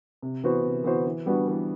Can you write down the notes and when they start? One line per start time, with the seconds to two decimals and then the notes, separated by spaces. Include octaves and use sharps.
0.22 C3
0.44 E3 B3 F#4 C5
0.64 C3
0.84 E3 B3 F#4 C5
1.06 E3
1.26 G3 B3 D4 F#4
1.47 E3